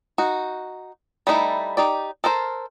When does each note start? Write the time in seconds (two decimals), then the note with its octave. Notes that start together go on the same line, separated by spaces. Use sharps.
0.18 D#4 F#4
1.27 G3 A3 D#4 E4
1.77 D#4 G4 D5
2.24 A4 A#4 C5